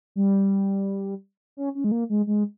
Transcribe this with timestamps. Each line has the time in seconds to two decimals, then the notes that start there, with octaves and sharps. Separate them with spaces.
0.16 G3
1.57 C#4
1.75 C#4
1.84 G#3
1.92 A#3
2.10 G#3
2.27 G#3